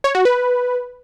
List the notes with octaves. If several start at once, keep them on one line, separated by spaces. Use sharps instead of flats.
C#5
F#4
B4